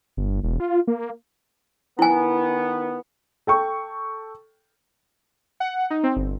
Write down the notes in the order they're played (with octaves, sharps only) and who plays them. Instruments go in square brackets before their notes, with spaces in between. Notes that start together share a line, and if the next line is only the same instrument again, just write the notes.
[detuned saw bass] G1
E1
F4
A#3
[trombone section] D#3 B3 [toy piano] E4 G#5
[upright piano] A4 G5 C#6
[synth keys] F#5
D#4
C4
G1